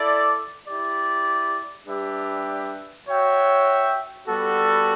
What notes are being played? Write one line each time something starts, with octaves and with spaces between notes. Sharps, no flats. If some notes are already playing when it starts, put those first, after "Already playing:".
Already playing: E4 A4 D5
E4 G4 D5
G3 D4 G4 B4 E5
F#4 C#5 E5 G5
G3 B3 F#4 A4